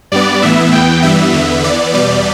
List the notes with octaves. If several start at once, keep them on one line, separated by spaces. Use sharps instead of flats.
G2 G3 B3 D5
A2 E3 B3 E5
E2 E3 B3 G5
G2 E3 G3 B3 E5
E2 D3 B3
E2 E3 B3 D5
E2 B2 G3 B3 D5